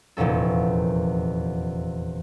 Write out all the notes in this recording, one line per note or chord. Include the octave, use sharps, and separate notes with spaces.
F1 E2 A#2 C#4 A4